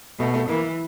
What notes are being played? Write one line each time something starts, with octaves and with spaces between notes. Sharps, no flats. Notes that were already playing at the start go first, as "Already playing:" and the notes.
B2 A3
A3
E3 A#3